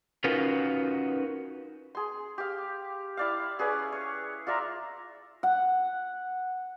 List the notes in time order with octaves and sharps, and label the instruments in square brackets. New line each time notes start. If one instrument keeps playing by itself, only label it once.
[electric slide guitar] C#4 D#4 F4 F#4 A#4 B4
[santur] G#4 C6
G4 F5
E4 D5 F5
C#4 G#4 B4 D5
C#5
F4 D5 E5 A#5
[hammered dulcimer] F#5